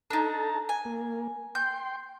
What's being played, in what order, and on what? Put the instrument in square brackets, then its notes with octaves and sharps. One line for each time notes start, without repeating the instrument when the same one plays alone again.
[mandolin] D4 D#4 [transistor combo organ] A4 A5 A#5
[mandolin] G#5
[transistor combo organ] A#3
[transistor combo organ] G5 C6 [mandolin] G6